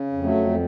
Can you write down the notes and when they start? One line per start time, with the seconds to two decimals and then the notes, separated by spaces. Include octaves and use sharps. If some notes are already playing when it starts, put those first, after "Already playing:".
Already playing: C#3
0.13 F2
0.23 F#3 A3
0.35 F2